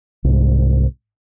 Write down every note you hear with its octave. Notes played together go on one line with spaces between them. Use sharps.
C2 G#2